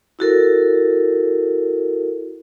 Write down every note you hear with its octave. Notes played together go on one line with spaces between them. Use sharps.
E4 F#4 A4 A#4